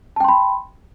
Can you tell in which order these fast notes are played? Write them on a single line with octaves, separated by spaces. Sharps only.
A5 G5 C6 B5